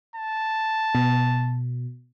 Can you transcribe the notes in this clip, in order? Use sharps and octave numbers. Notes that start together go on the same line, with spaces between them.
A5
B2